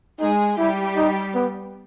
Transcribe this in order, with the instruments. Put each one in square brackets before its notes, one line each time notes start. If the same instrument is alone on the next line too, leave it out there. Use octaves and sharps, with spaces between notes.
[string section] G#3 G#4 [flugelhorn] D#4
[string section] G3 G4 [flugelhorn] E4
[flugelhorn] D#4
B3